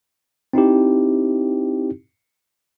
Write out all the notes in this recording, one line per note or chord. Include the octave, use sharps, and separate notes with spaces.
C4 D#4 E4 G4